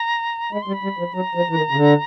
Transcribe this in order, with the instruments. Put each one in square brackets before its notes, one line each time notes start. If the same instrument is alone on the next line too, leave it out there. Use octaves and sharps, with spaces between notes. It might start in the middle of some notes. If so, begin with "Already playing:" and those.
Already playing: [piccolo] A#5
[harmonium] G#3 [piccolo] B5
[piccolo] C6
[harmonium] G3
[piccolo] B5
[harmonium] G3
F3
[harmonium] F#3 [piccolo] A#5
[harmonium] F3
E3
D#3
C#3
D3